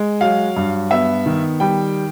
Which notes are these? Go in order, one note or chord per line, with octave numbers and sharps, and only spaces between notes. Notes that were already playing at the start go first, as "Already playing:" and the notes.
Already playing: G#3
F#3 F5
G2
B3 E5
D#3
G3 G5